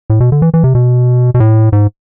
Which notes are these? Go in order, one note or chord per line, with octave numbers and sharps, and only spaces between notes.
A2
B2
D3
E3
E3
C3
B2
B2
A2
G#2